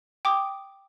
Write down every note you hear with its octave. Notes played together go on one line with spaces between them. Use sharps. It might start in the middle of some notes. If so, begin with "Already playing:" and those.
G5 D6 D#6